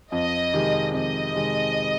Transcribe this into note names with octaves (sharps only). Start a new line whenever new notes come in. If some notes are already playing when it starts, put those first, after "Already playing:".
F2 D#5
C3 D#3 G#3
F2 D#5
C3 D#3 G#3